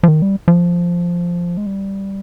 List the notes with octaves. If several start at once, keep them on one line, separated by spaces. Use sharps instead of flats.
F3
D#3
G3
F3
G#3
G3